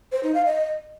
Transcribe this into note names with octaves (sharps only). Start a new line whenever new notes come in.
C5
D#4
F5
D#5